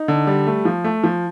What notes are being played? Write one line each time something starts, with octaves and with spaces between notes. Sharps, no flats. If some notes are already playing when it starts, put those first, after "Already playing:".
Already playing: D#4
D3
G3
A3
F3
A3
F3